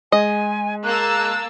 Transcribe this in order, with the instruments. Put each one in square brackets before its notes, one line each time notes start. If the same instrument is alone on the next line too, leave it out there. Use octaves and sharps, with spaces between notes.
[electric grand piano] G#3 [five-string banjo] D#5 [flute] G#5
[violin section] A#3 A5 E6 [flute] F#6